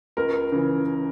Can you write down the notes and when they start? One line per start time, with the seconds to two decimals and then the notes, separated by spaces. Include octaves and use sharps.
0.17 C#2 A#4
0.52 C#3 E3